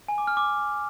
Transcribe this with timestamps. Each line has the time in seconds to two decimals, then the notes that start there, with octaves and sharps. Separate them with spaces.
0.08 G#5
0.18 D6
0.27 F6
0.37 D6